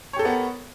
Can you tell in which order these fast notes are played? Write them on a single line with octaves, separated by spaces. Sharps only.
C#5 G4 A4 A#4 B3